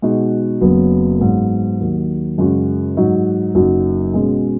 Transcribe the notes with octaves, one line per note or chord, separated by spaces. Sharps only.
B2 G#3 D#4 F#4
F#1 F#2 F#3 B3
G#2 F#3 B3
D#2 D#3 F#3
F#2 C#3 G#3 C#4 F#4
G#2 F#3 D#4 F#4
F#1 F#2 F#3 D#4 F#4
B2 G#3 C#4 F#4